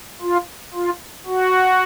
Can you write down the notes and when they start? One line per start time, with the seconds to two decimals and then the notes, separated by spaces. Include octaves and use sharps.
0.22 F4
0.74 F4
1.26 F#4